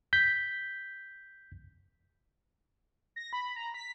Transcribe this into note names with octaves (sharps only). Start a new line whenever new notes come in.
G6 B6
A#6
B5
A#5
B6